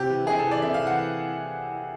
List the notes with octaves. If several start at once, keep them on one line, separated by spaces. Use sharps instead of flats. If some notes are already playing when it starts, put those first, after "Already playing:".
Already playing: C3 G4
E3
C3 G#4
A4
E3
D5
C3 E5
F5
E3
F#5